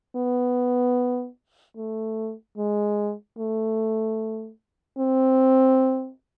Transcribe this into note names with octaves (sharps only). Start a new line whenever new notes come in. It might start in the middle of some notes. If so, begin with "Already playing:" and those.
B3
A3
G#3
A3
C4